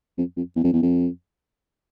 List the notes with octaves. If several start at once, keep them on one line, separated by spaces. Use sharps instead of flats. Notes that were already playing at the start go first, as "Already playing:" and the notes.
F2
F2
E2
F2
E2
F2